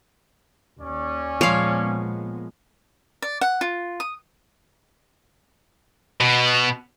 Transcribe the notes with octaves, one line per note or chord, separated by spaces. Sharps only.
D#2 C#4 D5
A#2 F3 G#3 B3 C#5 F5
D5
F#5
F4
D#6
B2